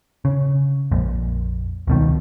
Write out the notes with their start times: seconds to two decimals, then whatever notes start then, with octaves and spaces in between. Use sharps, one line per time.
0.25 C#3
0.91 A#1 F2 A#2
1.87 C#2 B2 D#3